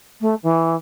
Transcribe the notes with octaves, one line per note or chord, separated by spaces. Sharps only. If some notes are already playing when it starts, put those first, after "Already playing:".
A3
E3